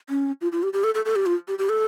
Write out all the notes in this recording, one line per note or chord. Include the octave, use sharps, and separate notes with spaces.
C#4
F4
F4
G4
G4
A4
A4
A4
G4
F4
G4
G4
A4